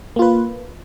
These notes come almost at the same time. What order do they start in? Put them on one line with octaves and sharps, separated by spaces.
A#3 F4 B4